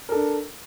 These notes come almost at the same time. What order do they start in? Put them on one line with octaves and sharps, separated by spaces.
A#4 A4 D4